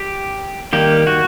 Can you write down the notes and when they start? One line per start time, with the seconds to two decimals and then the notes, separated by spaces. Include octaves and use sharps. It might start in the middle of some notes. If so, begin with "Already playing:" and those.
Already playing: G4
0.73 D#3 G3 A#3 G4
1.07 F#4